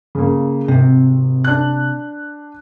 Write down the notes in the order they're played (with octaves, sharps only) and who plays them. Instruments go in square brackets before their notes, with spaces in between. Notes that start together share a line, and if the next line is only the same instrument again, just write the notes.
[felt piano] C#3 A#3
[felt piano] G#1 [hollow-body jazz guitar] C3
[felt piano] D4 F#6